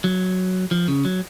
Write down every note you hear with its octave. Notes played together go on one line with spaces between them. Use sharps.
F#3
F3
C#3
F#3